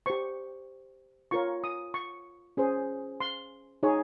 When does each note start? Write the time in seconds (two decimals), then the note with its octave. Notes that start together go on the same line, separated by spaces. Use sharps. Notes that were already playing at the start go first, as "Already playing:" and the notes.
0.06 G4 C5 C#6
1.31 F4 A#4 C#5 C#6
1.64 D#6
1.94 C#6
2.57 C#4 G#4 C5
3.21 C6
3.83 D#4 G#4 C#5